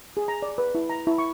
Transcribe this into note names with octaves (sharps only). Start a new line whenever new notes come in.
G#4
A#5
D5
B4
E4
A#5
E4
C#6